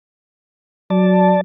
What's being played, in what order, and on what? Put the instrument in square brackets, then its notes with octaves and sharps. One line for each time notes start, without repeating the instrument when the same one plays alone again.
[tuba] F#3 [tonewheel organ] D5 A5